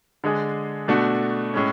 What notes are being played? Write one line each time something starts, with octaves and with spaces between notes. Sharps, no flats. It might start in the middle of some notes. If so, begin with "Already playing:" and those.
D3 G#3 D4 G#4
B2 A3 D4 F#4
A2 G#3 C#4